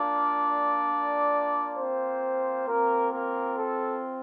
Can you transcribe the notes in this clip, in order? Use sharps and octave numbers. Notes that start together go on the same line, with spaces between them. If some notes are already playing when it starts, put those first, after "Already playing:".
Already playing: A#3 D4 F4 D5
A#3 F4
C4 C5
A#3 C4 F4 A#4
A#3 A#4
A4